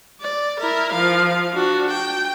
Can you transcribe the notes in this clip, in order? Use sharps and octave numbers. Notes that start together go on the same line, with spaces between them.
D5
E4 A#4
F3 F5
D4 F#4
G5